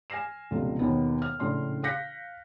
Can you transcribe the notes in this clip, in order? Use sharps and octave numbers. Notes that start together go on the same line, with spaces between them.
G#5 F6 A#6 C7 E7
F1 C#2 B2 F4
D#2 B2 D#3 B3
F6
A#1 A2 C#3 D4 C6 F6
F5 F#6 G6 A#6 B6 C#7